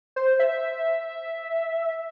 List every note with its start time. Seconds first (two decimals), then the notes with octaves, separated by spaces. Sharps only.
0.16 C5
0.40 E5